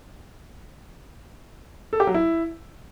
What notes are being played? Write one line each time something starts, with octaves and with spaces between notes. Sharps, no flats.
A4
G4
F#3
E4